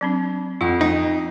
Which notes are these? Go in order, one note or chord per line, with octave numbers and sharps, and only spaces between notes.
F#3 C4 D4
F2 F4 F#5
D#4